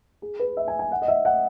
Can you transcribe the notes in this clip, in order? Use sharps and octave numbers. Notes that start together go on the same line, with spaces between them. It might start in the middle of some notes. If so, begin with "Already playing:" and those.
G#4
B4
E5
G#5
G#5
F#5
D#5
E5
F#5